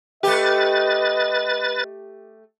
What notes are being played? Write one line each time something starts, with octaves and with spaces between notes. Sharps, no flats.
A3 G4 B4 D#5 A6